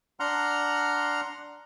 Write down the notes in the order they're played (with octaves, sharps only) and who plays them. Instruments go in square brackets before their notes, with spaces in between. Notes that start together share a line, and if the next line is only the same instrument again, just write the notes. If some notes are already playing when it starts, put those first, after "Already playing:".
[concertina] D4 F#5 A#5 C6 F6